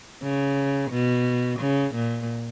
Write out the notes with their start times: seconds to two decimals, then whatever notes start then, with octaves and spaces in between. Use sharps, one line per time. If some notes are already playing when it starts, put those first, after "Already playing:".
0.22 C#3
0.91 B2
1.60 C#3
1.95 A#2